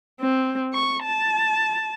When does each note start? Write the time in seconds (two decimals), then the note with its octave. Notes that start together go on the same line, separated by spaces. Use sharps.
0.20 C4
0.74 C#6
1.03 A5